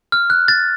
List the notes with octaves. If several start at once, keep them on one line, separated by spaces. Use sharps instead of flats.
F6
F#6
A6